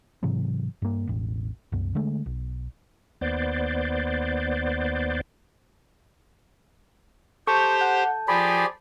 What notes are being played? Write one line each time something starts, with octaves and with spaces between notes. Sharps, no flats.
G#2 C3 E3 F#3
G2 A#3
E1 A1
C2 F#2
D3 G#3 A3
B1
D#2 B3 C5 D5
G4 A4 C5 A5 C6 C#6 G6
F#5
F3 F4 G4 G#4 D5 B5